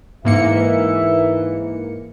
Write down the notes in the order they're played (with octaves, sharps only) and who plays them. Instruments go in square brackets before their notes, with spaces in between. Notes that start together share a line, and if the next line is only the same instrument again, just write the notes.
[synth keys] G#2 A#3 C#7 [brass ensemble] E3 [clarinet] E5